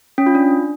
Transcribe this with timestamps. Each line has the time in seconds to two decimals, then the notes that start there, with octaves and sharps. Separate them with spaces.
0.18 C#4
0.26 F4
0.35 D4